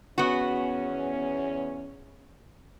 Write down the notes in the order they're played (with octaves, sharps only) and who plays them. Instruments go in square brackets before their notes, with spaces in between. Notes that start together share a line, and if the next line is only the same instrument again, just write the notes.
[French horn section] E2 C#4 [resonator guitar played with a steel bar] B3 F#4